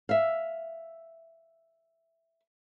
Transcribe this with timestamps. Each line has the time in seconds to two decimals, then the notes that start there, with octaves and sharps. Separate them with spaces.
0.09 E5 F5